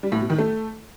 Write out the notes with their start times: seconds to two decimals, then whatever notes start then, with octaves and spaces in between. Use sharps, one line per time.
0.03 G3
0.12 A2
0.21 B2
0.30 D#3
0.38 A3